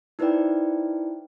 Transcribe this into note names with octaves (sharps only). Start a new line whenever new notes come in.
D#4 E4 B4 C5 D5 G5